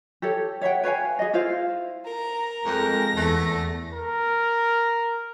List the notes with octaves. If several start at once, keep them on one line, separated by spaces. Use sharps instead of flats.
G4 A4 C#5
C#5 E5 F#5 G5
B4 C#5 F5 G#5
G#4 D#5
E4 F4 C5 F5
A#4 A#5
F2 G#3 A#6
E2 A3
A#4